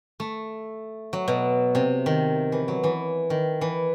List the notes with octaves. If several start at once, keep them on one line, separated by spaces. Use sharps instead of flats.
A3
F#3
B2
C3
D#3
E3
F#3
E3
D#3
E3